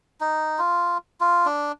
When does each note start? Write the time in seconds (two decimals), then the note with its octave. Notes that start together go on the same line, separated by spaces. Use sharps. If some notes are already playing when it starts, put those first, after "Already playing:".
0.21 D#4
0.58 F4
1.21 F4
1.46 D4